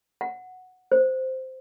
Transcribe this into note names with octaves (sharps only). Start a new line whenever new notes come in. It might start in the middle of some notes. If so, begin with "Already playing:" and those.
F#5
C5